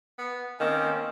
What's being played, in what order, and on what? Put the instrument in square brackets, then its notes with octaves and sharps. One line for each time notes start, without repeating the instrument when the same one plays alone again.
[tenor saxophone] B3
[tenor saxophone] D#3 [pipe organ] A#3 C4 C#4